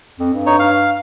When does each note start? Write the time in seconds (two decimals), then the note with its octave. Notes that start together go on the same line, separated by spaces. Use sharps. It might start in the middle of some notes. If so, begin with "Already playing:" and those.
0.19 F2
0.33 G2
0.46 D#4 C#5
0.59 F5